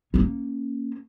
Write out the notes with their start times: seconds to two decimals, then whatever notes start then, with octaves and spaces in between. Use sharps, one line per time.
0.14 A#3 C#4